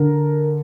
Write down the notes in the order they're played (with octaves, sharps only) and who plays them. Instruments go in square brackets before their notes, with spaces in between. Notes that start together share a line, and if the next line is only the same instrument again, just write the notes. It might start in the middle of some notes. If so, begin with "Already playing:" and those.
Already playing: [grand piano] D3 A#4